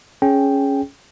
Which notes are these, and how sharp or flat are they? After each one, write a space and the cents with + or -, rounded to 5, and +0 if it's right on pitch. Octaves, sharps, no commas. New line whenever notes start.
C#4 +0 G#4 +15 G5 +0